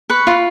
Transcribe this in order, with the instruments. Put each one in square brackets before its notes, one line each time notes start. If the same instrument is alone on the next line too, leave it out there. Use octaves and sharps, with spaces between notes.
[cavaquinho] B4 C#6
F4